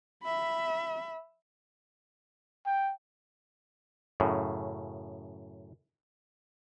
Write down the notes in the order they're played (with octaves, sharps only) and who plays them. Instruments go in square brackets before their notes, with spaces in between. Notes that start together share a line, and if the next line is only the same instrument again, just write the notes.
[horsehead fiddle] E5 B5
[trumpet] G5
[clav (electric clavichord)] F#2 A2 C#3